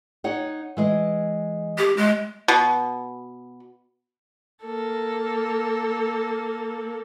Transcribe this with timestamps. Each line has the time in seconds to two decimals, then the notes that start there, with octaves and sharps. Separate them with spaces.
0.24 D#4 C#5 F#5
0.77 E3 G#3 D#5
1.78 G4
1.97 G#3
2.48 B2
4.64 A#3 A4